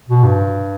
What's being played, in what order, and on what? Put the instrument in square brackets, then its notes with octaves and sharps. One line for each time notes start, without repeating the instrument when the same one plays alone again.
[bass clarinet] B2
G2